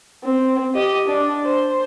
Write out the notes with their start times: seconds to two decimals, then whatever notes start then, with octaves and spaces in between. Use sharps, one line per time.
0.24 C4
0.75 G4 D#5
1.08 D4
1.45 C5